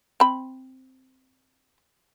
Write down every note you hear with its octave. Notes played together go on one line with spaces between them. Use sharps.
C4 B5